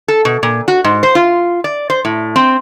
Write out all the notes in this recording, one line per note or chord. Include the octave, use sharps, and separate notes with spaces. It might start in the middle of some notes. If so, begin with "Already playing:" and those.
A4
B2
A#2
F#4
G#2
C5
F4
D5
C5
A2
C4